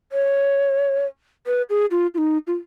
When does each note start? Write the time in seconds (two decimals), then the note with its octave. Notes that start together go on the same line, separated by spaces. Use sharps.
0.12 C#5
1.46 B4
1.70 G#4
1.91 F4
2.14 F4
2.18 D#4
2.47 F4